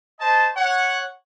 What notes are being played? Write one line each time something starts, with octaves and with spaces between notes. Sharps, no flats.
C5 D#5 A5
C#5 F#5